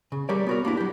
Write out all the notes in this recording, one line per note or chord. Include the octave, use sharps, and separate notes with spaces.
C#3
G3 G4 A#4 C#5 D5
B3 F#4 A#4
A#3 D4 E4
F#3 G4